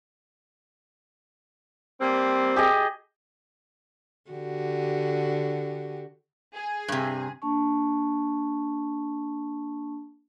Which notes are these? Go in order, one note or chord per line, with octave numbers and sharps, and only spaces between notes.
G3 A#3 C4
G4 G#4 D#5
D3 F#4 G4
G#4
G2 C3
A#3 D4 A5 C#6